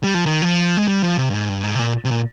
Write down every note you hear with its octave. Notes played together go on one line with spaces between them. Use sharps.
G3
F3
D#3
F3
G#3
G3
F3
C3
G2
G#2
G2
G#2
C3
A#2
C3
A#2